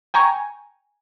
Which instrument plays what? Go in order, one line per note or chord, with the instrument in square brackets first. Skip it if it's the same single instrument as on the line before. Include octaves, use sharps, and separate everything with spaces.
[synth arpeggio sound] G5 G#5 A#5 C#6